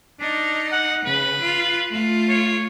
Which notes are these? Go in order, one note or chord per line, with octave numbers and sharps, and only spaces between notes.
D4 D#4
F#5
C#3 B4
F4
A3 F4
C#5